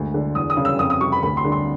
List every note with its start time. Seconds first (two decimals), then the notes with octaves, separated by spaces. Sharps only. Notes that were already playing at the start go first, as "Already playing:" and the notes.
Already playing: D2 G#3
0.14 D3
0.35 E2 D#6
0.50 D#6
0.57 C#3
0.65 E6
0.79 F2 D#6
0.90 D#6
1.01 C3 C#6
1.12 B5
1.23 D2 B5
1.37 C6
1.45 D3
1.52 C6